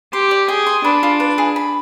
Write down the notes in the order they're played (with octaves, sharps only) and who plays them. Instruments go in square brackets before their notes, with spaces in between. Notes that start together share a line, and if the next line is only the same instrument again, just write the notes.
[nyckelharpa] G4 [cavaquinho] C6
[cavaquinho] D5
[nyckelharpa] G#4 [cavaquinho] G5
[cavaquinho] C6
[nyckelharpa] D4 [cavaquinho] B4
[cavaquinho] F4
B4
G#4
B5